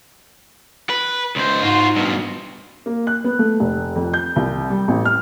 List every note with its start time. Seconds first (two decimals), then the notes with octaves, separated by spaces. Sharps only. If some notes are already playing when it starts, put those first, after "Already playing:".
0.90 B4
1.36 C#2 C5
1.62 G#2 F4 F#4
1.96 G2 B2
2.86 A#3
3.07 F#6
3.24 B3
3.39 A3
3.60 F1
3.95 F2
4.14 G6
4.36 C2
4.70 G3
4.88 A1
5.05 F6